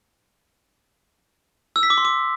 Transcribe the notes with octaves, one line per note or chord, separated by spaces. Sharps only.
E6
B6
D6
C6
D6